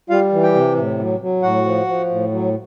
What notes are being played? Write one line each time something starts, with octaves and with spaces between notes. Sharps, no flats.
G3 F4 F5
E3
G4 G5
C3
A2
F#3
F#3
A2 F#4 F#5
F3
F3
A2
F#3